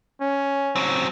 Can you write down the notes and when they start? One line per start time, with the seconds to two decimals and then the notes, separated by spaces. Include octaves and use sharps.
0.22 C#4
0.76 F#3 C4